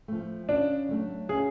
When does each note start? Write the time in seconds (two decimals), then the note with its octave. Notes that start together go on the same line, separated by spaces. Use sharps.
0.08 F3 A3
0.48 C#3 D4
0.89 F#3 A3 D4
1.29 C#3 G#4